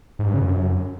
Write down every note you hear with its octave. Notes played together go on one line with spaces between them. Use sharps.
G#2
G2
C#3
F#2